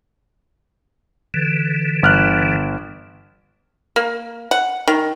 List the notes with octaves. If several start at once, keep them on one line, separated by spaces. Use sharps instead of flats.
D3 E3
G1 F6 F#6
A#3
F#5
D#3